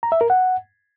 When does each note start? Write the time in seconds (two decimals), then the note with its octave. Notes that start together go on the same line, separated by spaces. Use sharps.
0.03 A#5
0.12 E5
0.21 A#4
0.30 F#5